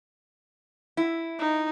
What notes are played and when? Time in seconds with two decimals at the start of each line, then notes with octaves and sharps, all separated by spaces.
0.97 E4
1.39 D#4